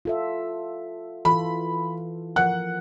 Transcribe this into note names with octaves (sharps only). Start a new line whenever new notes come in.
F4 A4 E5
E3 F4 A4 B5
F3 A#4 F#5 F#6